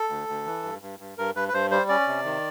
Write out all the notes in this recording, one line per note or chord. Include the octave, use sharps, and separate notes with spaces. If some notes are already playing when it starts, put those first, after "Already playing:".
Already playing: A4
D2
D2
E3
G2
G2
G2
G2 A#4
G2 B4
B4
G2 C5
G3 C5
C#4 D5
C3
D#3